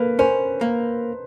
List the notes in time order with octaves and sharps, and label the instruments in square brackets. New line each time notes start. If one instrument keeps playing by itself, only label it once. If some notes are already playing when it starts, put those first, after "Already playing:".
Already playing: [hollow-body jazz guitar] A#3 [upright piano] A4 B4
[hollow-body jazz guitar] C#4 [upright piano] A#4 C5
[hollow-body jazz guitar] A#3